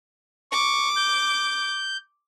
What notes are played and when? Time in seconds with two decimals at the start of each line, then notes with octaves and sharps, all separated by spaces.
0.52 C#6 D6
0.96 G6